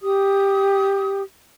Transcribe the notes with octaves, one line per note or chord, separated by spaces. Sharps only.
G4 D#6